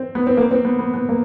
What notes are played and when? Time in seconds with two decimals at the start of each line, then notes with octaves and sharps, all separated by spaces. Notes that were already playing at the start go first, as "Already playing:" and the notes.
Already playing: C4
0.15 B3
0.27 C4
0.37 A#3
0.51 C4
0.65 B3
0.79 B3
0.94 B3
1.09 A#3